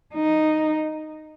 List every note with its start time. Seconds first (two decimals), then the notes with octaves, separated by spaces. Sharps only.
0.15 D#4